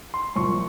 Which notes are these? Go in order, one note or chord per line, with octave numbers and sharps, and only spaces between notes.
C6
C2 A#2 F3 C#6